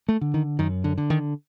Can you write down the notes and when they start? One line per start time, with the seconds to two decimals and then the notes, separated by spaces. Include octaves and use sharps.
0.08 A3
0.21 D3
0.34 D#3
0.59 F#2 D#3
0.84 D3
0.98 D3
1.10 D#3